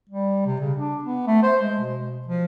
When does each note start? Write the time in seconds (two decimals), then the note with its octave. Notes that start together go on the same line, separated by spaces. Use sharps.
0.09 G3
0.46 C3
0.61 C#3
0.77 D4
1.04 B3
1.27 A3
1.43 C5
1.62 G#3
1.79 B2
2.28 F3